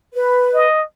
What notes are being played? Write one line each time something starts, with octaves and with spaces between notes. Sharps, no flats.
B4
D#5